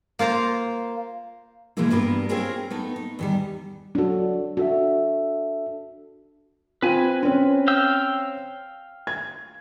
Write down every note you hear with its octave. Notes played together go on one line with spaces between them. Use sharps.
A#3 F4 C5 A#5
B2 E3 F3 G#3 A#3 E4
G2 G3 B3 F4 A#4
C4 C#4 F4 G#4 A#4 C5
A3 B3 D#4
D#4
E2 D#3 G3
F#3 D4 F#4 A4
D4 F#4 A4 E5
C4 F4 B4 G#5
C4 C#4
F5 G5 E6
G#6